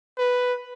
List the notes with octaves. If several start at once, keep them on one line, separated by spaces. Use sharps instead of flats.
B4